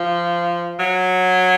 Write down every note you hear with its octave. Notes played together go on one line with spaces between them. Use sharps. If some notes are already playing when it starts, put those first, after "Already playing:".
Already playing: F3
F#3